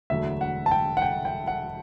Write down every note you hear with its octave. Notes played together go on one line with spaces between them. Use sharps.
E1 D2 D3 F#3 E5
F#5
A5
G5
F#5
G5
G5
F#5